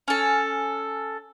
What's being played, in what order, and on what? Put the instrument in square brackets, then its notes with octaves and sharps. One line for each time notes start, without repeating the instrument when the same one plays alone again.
[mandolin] C#4 A4